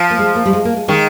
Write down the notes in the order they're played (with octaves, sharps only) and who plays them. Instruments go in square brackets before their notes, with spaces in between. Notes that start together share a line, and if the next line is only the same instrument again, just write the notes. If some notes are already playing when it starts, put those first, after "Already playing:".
Already playing: [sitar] F3
[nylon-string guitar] A#3
G#3
A#3
G3
G#3
A#3
G#3
[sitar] D#3 [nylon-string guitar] G#3